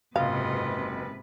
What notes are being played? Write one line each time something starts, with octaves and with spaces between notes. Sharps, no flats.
F#1 G#2 C3 F4 B4 D#5 F5